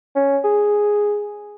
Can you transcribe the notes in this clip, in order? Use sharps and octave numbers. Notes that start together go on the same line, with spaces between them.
C#4
G#4